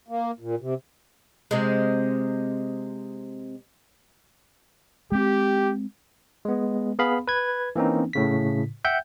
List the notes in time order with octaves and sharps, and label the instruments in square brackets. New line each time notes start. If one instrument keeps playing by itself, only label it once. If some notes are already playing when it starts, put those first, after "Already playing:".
[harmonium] A#3
A#2
C3
[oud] C3 G#3
[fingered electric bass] G#3 C4 [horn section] G4
[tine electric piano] G#3 B3
B3 G#4 F5 B5
B4 G#6
E3 A#3 C4 C#4 D#4
A2 C#3 B6
E5 F#5 G5 G6